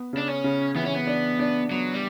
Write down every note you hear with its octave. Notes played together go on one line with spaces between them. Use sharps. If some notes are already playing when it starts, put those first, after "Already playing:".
Already playing: B3
C#3 D4
C#4
C#3
E3 B3
C#4
B3
D4
D4
F#3 B3
G3